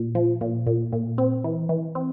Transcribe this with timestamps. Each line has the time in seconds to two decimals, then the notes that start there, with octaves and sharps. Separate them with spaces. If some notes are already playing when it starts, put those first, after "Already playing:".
Already playing: A#2
0.15 F3
0.41 A#2
0.67 A#2
0.92 A#2
1.18 C4
1.44 E3
1.69 E3
1.95 C4